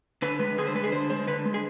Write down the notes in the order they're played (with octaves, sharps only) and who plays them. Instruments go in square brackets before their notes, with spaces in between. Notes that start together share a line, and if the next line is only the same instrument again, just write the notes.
[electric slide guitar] D3 B4
G#3 B4
D3 G#4
C5
G#3 B4
G#4
D3 C5
G#3 C5
D3 B4
G#3
G#4